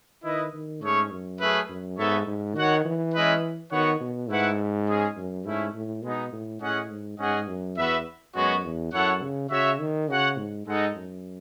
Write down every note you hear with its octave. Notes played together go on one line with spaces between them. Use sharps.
D#3 E4 B4 D#5
D#3
G#2 A3 C#4 G#4 C#5
F#2
A3 C#4 G#4 B4 E5
F#2
G#2 B3 D#4 A4 C#5 E5
G#2
D#3 F#4 C#5 F#5
E3
G#3 C#4 E4 B4 D#5
D#3 B3 F#4 C#5 F#5
B2
G#2 A3 E4 B4 F#5
G#3 C#4 G#4
F#2
G#2 A3 C#4 E4
A2
B2 G#3 B3 D#4
A2
A2 C#4 G#4 D#5 F#5
G#2
G#2 C#4 G#4 D#5 F#5
F#2
E2 B3 F#4 B4 E5
F#2 G#3 B3 F#4 C#5
E2
F#2 E4 A4 C#5 F#5
C#3
C#3 F#4 C#5 E5
D#3
C#3 F#4 C#5 F#5
G#2
G#2 G#3 D#4 A4 D#5 F#5
F#2